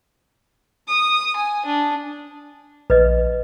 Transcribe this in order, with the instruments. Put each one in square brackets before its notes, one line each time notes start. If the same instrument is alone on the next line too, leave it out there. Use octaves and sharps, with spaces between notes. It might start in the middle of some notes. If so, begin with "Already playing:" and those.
[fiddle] D#6
G#5
D4
[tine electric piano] A#1 [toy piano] B4 D#5